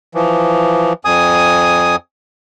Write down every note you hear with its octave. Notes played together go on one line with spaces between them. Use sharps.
E3 F3
F2 G#5 D#6